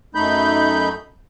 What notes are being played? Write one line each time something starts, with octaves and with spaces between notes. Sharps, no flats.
F#2 A3 D#4 B5 G6